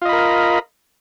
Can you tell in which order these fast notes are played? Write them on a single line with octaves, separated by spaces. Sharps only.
F4 D#5 B5 A#4